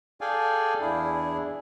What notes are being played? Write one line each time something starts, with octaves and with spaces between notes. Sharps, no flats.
G#4 A4 D5 F5 G5 G#5
E2 D4 E4 G#4